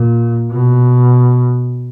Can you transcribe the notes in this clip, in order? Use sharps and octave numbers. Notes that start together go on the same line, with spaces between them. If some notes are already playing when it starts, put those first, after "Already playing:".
Already playing: A#2
B2